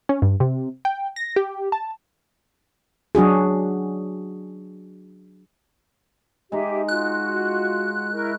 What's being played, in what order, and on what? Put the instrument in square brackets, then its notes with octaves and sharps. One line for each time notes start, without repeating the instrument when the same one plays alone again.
[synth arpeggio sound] C#4
G2
C3
G5
A#6
G4
A5
[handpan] F#3 D4 F#4 G#4
[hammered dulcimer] G#3 D#4 [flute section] G4 E5 G#5
[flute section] F4 F#4 [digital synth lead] F#6
[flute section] E4 A#4 C#6